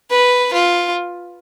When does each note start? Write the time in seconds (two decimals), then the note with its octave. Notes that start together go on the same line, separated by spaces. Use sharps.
0.11 B4
0.53 F4